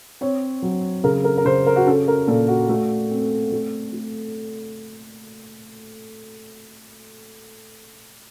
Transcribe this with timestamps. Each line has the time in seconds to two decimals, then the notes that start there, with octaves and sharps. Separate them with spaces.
0.21 C4 C#5
0.62 F#3
1.04 C#3 A#4
1.24 A#4
1.37 A#4
1.45 C#3 C5
1.66 A#4
1.76 F#4
1.86 C#4 A4
2.08 A#4
2.27 A#2 A4
2.48 F#4
2.69 A3
3.11 C4
3.52 A3
3.93 A3